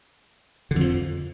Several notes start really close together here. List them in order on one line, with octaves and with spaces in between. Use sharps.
D3 F2 F3